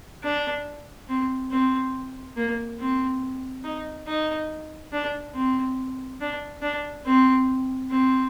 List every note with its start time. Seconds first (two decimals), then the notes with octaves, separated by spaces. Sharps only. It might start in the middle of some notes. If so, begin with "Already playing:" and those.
0.23 D4
1.09 C4
1.51 C4
2.36 A#3
2.80 C4
3.64 D#4
4.07 D#4
4.93 D4
5.35 C4
6.20 D4
6.62 D4
7.06 C4
7.90 C4